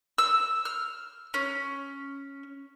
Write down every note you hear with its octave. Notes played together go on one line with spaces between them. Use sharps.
E6
F6
C#4